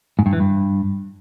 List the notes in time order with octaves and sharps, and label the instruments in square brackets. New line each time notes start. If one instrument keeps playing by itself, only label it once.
[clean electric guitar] G#2
G2
E3
G2